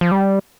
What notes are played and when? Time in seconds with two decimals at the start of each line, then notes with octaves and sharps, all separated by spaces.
0.01 F3
0.11 G3